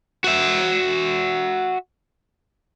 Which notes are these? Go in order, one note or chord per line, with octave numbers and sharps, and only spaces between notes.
F#4 E5